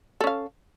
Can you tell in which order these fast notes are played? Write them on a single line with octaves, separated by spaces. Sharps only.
A4 C#4 F5